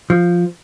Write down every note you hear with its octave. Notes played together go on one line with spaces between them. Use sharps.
F3